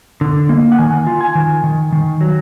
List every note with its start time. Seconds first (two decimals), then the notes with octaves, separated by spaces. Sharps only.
0.21 D3
0.49 A#3
0.72 F#5
0.79 D#3 G#5
1.07 F4
1.21 G#5
1.35 D#3
1.64 D#3
1.92 D#3
2.21 F#3